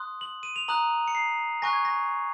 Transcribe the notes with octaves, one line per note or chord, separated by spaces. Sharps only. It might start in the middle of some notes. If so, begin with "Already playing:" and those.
Already playing: C6 D#6 F#6
F#7
D#7
F7
A#5 D#6 F#6 F#7
C#7
C7
G#5 C#6 F#6 A#6
G#6
A#6